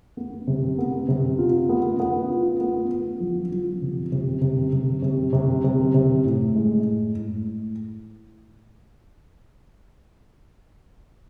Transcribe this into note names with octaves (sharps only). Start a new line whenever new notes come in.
B3
C3
B3
C3
F4
B3
B3
F4
B3
B3
F3
F3
C3
C3
C3
C3
C3
C3
C3
C3
A2
G#3
A2
A2